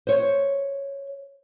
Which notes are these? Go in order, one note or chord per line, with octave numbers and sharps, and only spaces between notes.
C5 C#5